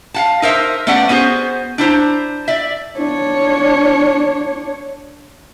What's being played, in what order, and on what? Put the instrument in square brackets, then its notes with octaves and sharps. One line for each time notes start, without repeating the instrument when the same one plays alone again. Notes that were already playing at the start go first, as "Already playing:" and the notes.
[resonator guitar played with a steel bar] F5 F#5 A5
D#4 A#4 C5 E5
A3 B3 C#4 D5 F#5
B3 C#4 F#4 G#4 C5
D4 E4 C5 A#5
D5 E5
[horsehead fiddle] D4 C#5